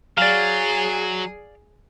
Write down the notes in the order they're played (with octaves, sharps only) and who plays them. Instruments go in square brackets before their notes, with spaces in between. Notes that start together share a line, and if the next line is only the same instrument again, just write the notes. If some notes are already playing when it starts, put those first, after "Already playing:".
[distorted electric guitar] F#3 [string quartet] G#4 [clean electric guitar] D5 F5